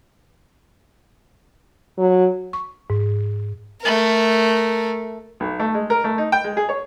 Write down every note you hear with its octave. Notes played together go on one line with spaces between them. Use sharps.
F#3
C#6
G#2
A3 A#4
B1
A3
G#3
A#4
A3
D#4
G5
G#3
G#4
C#5